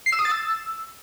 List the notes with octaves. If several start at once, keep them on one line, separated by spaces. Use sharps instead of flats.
C7
E6
D#6
A6
E6